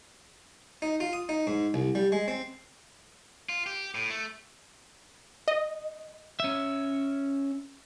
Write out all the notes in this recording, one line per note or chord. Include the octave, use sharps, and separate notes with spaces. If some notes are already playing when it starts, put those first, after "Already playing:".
D#4
F4
D#6
D#4
G#2
C2
G3
G#3
C4
F4
G4
A2
A3
D#5
C#4 E5